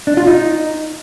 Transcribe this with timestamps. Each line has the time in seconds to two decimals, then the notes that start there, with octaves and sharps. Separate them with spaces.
0.07 D4
0.17 F4
0.27 D#4